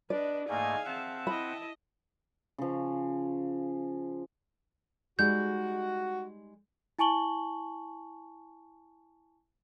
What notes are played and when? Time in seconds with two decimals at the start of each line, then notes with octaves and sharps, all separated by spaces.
0.10 D4 B4 D5 D#5
0.49 G#2 A3 A#3 G#4 D#5 F5 G#5
0.85 C4 E5 F#5 A5
1.27 E4 D#5 B5
2.58 C#3 F3
5.19 G3 G#3 D#4 F#4 G6
6.99 E4 G#5 A5 C#6 F#7 G7